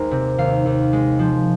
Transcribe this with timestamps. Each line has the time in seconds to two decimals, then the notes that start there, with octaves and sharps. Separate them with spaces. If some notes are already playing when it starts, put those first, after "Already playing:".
Already playing: D#2 G#3 A#4 C5
0.11 C3
0.38 D#2 F5
0.66 D#2
0.93 G#3
1.19 F3